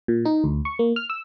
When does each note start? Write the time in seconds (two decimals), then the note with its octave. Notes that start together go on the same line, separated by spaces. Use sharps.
0.08 A#2
0.25 D#4
0.44 D2
0.65 C#6
0.79 A#3
0.96 F6
1.10 E6